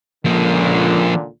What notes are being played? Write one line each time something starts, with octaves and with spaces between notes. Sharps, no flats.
C#2 A#2 D3 F3 A#3